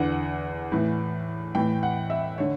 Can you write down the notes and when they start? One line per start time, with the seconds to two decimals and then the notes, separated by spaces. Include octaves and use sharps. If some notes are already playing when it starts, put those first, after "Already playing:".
Already playing: E2 D3 F#5
0.72 A2 E3
1.55 A2 E3 G5
1.83 F#5
2.10 E5
2.38 D3 C#5